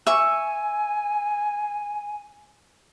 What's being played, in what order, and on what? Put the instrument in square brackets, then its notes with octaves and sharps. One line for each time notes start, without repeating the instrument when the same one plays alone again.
[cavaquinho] E5 C#6 [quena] G#5